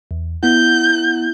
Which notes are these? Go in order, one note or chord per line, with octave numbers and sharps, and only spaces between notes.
E2
B3 E4 F#5 G6